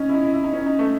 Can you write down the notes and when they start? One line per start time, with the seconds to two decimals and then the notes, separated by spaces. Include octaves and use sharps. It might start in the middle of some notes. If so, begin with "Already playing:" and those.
Already playing: C#4 D#4
0.09 E4
0.14 D#4
0.24 E4
0.34 E4
0.44 D#4
0.54 C#4
0.66 D#4
0.79 A3